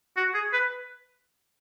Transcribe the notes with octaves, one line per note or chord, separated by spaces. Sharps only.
F#4
G#4
B4